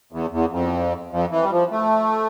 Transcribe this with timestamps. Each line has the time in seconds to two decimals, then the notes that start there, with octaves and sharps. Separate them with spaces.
0.12 E2
0.32 E2
0.52 F2
1.12 F2
1.31 E3
1.43 G3
1.51 F3
1.71 A3